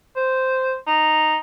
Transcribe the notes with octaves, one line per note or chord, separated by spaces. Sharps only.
C5
D#4